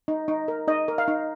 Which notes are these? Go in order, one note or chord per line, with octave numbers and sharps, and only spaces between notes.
D#4
D#4
A#4
D#4 D#5
A#4
F5
D#4